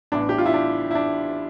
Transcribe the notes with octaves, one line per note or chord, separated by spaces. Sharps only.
A1 A2 E3 B3 D4
G4
F4
E4
D4
E4
D4